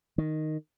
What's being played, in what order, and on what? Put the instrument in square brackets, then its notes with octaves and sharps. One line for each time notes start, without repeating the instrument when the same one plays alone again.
[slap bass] D#3